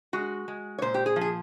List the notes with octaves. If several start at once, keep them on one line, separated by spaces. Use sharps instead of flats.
G#3 F#4
G#3
C#5
A#2 C5
G4
G#4
F3
G#4